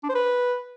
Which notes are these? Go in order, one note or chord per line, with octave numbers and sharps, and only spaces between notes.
D4
C5
B4